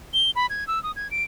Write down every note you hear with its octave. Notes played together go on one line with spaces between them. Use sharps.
G7
B5
G#6
E6
D#6
G#6
D7